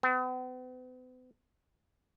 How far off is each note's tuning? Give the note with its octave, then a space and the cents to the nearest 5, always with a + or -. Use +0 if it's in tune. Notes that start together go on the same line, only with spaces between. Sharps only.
B3 +45